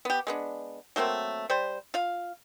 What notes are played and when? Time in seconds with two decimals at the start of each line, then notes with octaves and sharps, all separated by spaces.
0.05 B3 G4
0.27 G#3 B3 D4
0.96 F#3 A3 A#3 C4
1.50 G3 C5
1.94 F4 F5